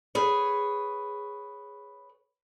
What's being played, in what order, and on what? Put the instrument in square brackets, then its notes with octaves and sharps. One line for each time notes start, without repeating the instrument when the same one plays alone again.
[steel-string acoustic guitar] G#4 B4 C#5